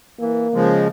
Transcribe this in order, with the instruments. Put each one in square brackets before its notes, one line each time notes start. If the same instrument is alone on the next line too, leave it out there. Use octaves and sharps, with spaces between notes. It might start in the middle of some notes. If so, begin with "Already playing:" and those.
[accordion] E3 [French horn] A#3
[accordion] C#3 F3 G#3